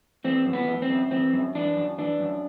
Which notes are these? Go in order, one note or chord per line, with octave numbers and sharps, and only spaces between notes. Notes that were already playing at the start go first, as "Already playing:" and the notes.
E3 C4
F#2
B3
E3
C4
F#2
E3 C4
F#2
E3 D4
F#2
E3 D4
F#2